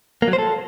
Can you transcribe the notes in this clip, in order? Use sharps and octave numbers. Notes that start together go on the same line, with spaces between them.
A#3
F#3
C5
A4